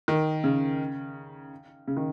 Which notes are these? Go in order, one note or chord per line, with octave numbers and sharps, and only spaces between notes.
D#3
C#3
C#3
D#3